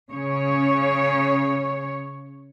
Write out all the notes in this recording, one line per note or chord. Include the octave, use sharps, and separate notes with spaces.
C#3 C#5